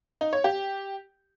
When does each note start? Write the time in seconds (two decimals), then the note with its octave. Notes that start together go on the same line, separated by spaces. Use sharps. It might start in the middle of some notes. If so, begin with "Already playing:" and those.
0.21 D#4
0.33 C#5
0.44 G4